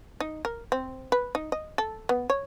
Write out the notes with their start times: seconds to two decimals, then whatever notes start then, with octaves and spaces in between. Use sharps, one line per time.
0.20 D#4
0.45 A#4
0.72 C4
1.12 B4
1.35 D#4
1.52 D#5
1.78 A4
2.09 B3
2.30 C#5